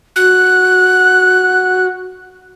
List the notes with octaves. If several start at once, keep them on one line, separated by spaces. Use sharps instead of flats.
F#4 F#6